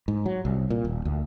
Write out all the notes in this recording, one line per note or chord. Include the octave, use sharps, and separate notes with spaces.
G#2
F#3
C2
A#2
D#1
D2